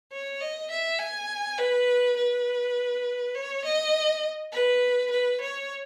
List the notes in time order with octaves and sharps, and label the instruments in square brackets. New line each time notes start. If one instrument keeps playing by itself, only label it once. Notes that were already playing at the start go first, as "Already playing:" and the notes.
[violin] C#5
D#5
E5
G#5
B4
B4
C#5
D#5
B4
B4
C#5